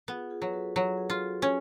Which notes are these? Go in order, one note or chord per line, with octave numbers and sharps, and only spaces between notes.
B3 F4 G#4
F4 G#4
F#3 B4
F#4 A4
F#3 F4 G#4
G#4
F4 F#4 A4
C#4